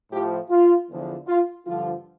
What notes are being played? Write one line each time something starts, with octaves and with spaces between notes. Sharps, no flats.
A2 F3 G4
F4
E2 D3 F3
F4
G2 D3 F3 F4